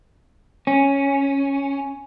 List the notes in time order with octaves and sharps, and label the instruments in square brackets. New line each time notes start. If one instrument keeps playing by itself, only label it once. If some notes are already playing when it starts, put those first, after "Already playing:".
[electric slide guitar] C#4